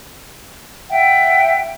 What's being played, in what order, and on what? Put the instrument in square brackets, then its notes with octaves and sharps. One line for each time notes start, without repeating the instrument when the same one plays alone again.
[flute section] E5 F#5 G5